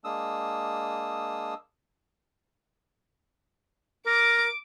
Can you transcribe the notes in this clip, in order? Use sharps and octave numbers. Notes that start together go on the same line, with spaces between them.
G#3 A#3 D4 D#6 E6
A#4 D6